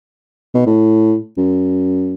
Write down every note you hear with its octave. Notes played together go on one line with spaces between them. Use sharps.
B2
A2
F#2